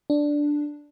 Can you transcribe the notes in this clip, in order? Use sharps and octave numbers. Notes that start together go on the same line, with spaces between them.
D4